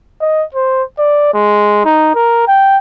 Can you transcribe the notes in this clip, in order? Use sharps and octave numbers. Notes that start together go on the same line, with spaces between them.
D#5
C5
D5
G#3
D#4
A#4
G5